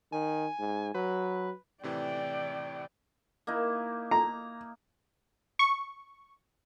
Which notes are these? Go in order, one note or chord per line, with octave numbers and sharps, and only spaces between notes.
D#3 G#5
G#2
F#3 B4
A2 C3 E3 D5 G5
A#3 D#4 E4
A#5
C#6